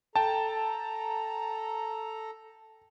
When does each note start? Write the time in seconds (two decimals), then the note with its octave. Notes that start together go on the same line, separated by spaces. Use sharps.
0.16 A4 G5 A5 A#5